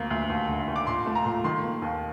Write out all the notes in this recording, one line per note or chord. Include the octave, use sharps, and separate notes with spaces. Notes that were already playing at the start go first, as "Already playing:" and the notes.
Already playing: D2 A#3
D2
D#2
D3
D#2
D6
A#2 C6
A3
A#5
A#2
D#3 C6
A#3
D#2